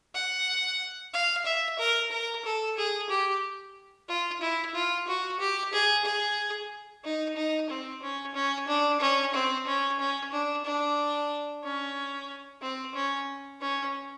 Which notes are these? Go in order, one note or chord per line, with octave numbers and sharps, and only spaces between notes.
F#5
F5
E5
A#4
A#4
A4
G#4
G4
F4
E4
F4
F#4
G4
G#4
G#4
D#4
D#4
C4
C#4
C#4
D4
C#4
C4
C#4
C#4
D4
D4
C#4
C4
C#4
C#4